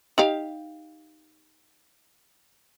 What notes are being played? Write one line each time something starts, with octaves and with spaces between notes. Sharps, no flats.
D#4 G4 F5